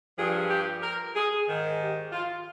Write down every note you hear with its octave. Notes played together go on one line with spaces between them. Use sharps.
G2 F3 G#4
G4
A#4
G#4
G#2 D#3
G4
F4